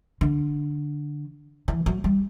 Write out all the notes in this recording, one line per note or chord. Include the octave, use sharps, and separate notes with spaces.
D3
E3
F#3
G3